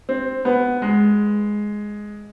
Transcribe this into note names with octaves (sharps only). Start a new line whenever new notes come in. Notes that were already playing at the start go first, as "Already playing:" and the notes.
C4
B3
G#3